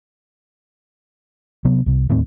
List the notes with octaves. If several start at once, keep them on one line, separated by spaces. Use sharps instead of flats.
C3 F#3 B3
C2 C3
D1 D#2 A2 C4